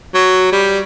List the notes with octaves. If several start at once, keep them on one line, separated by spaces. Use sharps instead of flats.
F#3
G3